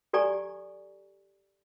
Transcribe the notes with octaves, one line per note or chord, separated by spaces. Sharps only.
G4 A4 D5 G#5 A#5 C#6